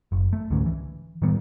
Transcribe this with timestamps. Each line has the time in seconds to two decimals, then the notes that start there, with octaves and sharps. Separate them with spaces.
0.12 F#1
0.33 A3
0.50 C#2 G#2 D3 C#4
0.66 E3
1.22 A2 D#3 G3 B3